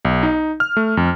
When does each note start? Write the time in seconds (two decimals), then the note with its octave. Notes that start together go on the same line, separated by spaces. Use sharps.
0.05 B1
0.23 D#4
0.60 F6
0.77 A3
0.97 F2